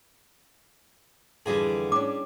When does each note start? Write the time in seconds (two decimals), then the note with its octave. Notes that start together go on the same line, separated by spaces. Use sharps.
1.46 F2 D3 E3 G3 G#4
1.92 C#4 D4 D6